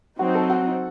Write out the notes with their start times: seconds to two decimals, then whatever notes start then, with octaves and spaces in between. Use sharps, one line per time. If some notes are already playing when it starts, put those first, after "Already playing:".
0.19 F#3 C4 D#4 F#4
0.35 A4
0.50 F#4